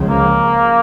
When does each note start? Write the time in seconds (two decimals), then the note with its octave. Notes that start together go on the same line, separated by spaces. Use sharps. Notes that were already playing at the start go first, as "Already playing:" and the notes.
Already playing: C#2 C#3 F3
0.09 A#3